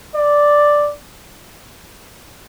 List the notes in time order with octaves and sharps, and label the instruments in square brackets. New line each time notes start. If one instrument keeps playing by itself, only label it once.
[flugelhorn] D5